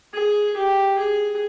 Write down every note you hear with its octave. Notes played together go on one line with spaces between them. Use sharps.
G#4
G4
G#4